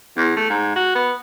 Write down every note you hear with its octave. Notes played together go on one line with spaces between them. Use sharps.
E2
A3
G#2
F#4
B3